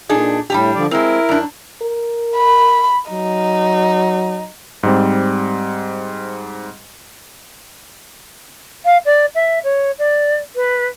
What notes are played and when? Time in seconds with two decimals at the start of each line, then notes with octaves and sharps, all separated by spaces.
0.09 A#2 D4 D#4 G#4
0.50 A2 G3 D4 G4
0.75 D3 F3 D5
0.91 G#3 C4 E4 A#4
1.29 F#2 D4
1.82 A#4
2.36 B5
3.10 F#3 D#4
4.83 G#2 G3 C4
8.85 F5
9.06 D5
9.35 E5
9.64 C#5
9.99 D5
10.56 B4